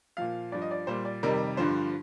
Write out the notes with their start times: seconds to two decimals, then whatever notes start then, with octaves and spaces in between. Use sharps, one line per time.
0.17 A#2 F3 F5
0.52 G2 F3 D5
0.62 D#5
0.71 D5
0.87 A#2 G3 C5
1.05 D5
1.23 F2 C3 D#3 G3 A#4
1.57 G2 D3 F3 C5